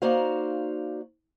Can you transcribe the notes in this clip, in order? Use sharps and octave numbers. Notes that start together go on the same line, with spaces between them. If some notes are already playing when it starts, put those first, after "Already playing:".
A#3 D#4 F#4 C5 D5 F5